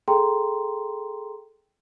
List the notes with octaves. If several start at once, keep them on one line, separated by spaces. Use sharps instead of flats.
G#4 A4 G5 A#5 C6